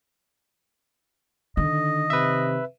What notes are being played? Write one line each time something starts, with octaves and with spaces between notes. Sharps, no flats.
D3 D#3 D#5
C3 B4 E5